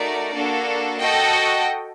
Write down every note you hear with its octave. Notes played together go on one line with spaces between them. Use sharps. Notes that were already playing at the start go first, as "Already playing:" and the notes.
Already playing: A3 D#4 F#4 A#4 D5
A#3 D4 F#4 A4
F#4 A4 D#5 G5